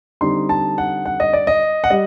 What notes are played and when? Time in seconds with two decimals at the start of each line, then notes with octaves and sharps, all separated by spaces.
0.21 D3 G3 C4 D#4 C6
0.49 A5
0.78 F#5
1.06 F#5
1.20 D#5
1.33 D5
1.47 D#5
1.84 F#5
1.90 G3 D#5